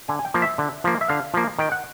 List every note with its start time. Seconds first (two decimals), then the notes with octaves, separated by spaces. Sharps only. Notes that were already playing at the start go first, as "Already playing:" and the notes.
0.08 D3 G#5
0.19 G#5
0.25 G5
0.34 F3 A#3
0.42 E5
0.58 D3
0.84 F3 A#3
1.01 E5
1.08 D3 F5
1.34 F3 A#3
1.59 D#3 G5
1.72 F#5